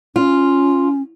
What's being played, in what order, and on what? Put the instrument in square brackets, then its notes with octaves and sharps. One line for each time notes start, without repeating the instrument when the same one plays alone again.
[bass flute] C#4 [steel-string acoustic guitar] F4